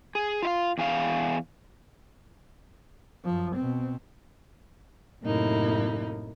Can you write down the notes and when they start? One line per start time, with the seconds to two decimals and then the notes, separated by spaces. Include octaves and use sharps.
0.15 G#4
0.42 F4 E5 F5
0.78 E2 G#4 F5
3.25 F#2 F3
3.56 B2 C4
5.23 F#2 A2 C3 A#3 D#4 E4